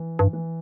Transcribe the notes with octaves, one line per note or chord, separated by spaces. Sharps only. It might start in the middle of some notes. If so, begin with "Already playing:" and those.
Already playing: E3
G2
E3